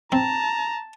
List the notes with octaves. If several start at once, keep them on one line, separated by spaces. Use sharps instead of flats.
C4 A5 A#5